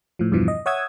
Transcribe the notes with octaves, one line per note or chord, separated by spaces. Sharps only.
A2 F3
E2 G2 B2 E3 F3
D#5
C#5 E5 F#5 D#6 E6 G#6